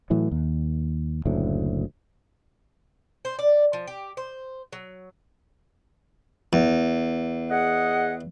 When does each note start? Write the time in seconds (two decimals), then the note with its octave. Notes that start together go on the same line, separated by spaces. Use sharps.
0.10 A2 E3 F#3
0.31 D#2
1.25 F#1 D2 A2
3.25 C5
3.39 D5
3.73 F3
3.87 G4
4.17 C5
4.72 F#3
6.53 E2
7.49 G#4 D#5 F#5